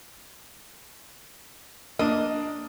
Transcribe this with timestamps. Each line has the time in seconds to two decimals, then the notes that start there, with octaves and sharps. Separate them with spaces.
1.99 A#3 D4 D#5